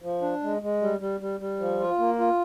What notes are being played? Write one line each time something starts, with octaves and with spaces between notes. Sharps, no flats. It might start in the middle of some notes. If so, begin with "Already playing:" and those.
F3
D4
G#3
G#3
G3
G3
G3
G3
F3
F4
A#3
F4